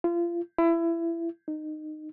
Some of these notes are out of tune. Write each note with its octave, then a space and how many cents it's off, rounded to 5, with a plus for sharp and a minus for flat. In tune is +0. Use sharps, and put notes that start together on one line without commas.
F4 -30
E4 +25
D#4 -20